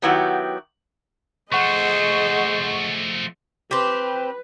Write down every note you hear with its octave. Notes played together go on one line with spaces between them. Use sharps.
D#3 F#3 B3 E4 F#4 G4
F3 A3 G#4 C5 D#5 F#5 C#6
C4 G4 B4